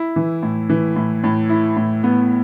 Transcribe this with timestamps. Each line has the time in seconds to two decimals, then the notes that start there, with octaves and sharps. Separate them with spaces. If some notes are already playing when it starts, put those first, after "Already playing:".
Already playing: E4
0.16 E3
0.43 A2
0.70 E3
0.96 A2
1.24 A2
1.49 E4
1.77 A2
2.04 B3